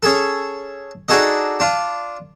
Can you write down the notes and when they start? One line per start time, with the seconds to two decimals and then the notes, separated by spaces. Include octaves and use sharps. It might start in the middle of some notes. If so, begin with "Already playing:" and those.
0.03 C#4 G#4 A4
1.09 D4 D#4 F#4 G#4 A4 D#5
1.60 D4 F4